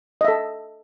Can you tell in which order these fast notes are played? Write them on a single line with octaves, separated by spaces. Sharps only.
D#5 E5 A4